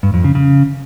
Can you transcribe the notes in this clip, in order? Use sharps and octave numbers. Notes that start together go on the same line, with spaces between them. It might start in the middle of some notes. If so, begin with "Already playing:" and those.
G2
F2
C#3
C#3